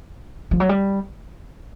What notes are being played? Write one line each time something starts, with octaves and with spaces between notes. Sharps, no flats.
F3
F#3
G3